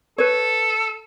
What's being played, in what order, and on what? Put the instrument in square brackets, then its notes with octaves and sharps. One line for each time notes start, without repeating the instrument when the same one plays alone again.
[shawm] A4 [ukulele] B4 C#5